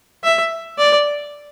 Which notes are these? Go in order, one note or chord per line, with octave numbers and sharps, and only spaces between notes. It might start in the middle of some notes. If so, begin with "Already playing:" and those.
E5
D5